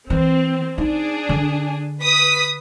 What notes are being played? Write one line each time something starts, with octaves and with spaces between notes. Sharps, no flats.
E3 C4
D4 D#4 G#4
D3
B4 D#6 B6